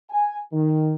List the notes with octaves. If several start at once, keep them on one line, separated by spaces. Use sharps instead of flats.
G#5
D#3